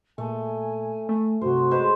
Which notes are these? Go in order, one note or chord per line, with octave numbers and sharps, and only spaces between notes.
A#2 A3 G#5
A3 G#5
G2 C3 F#4 C5
G#3 B4 C5